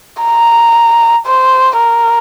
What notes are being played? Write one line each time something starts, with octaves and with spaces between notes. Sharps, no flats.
A#5
C5
A#4